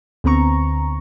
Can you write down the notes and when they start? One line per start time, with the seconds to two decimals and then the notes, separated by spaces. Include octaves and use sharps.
0.24 D2 D3 B3 C4 A#5 C#6